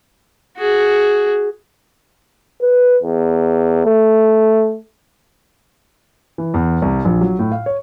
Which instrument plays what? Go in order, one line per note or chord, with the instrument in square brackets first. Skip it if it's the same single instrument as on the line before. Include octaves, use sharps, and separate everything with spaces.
[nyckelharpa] F#4 G#4
[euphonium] B4
E2
A3
[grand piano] E3
E2
C2
A#1
F#3
A2
F5
C#5